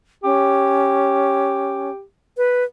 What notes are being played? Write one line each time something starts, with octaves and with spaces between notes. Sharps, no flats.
C#4 G4
B4